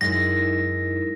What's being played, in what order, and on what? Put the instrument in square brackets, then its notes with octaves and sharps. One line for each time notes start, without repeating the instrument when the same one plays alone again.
[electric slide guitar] F#2 G#3 [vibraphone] D#4 E4 A#4 [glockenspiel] A#6